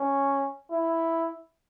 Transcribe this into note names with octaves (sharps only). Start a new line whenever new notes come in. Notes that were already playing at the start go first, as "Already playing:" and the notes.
Already playing: C#4
E4